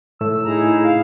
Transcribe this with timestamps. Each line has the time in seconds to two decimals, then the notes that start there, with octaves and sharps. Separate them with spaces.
0.21 A2 A3 E6
0.45 D#4 E4 G#4 A#5
0.84 C#3 F5